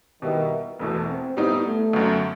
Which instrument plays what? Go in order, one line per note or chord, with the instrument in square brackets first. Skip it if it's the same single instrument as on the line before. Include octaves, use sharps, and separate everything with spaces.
[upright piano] B2 G3 B3 E4 [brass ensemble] D#3
[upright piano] E1 E2 B2 [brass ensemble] A3
[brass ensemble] C4
[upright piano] A2 G3 D#4 [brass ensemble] B3
[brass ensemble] A3
[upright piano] G1 F#2 F#3